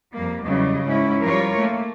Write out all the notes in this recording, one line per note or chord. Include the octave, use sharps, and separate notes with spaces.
F2 G3 A#3
E2 C#3 F#3 G3 D#5
G#2 C#4 E4
F3 G3 F4 A#4 C#5
A3 A#3